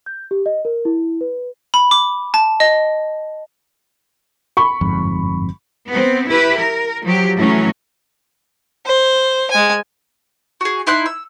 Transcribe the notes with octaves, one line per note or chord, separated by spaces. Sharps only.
G6
G4
D#5
A#4
E4
B4
B5
D6
A5
D#5
B5 C#6
G1 F2 G#2
B3 C4
E4 G4 B4
A#4
F3 F#3 G4
A2 E3 F#3 C#4
C5
G#3 G#5
F#4 G#4
D#4 E4 C6 F#6
E6